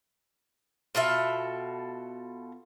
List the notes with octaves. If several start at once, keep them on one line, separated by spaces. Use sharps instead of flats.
B2 F4 A4 E5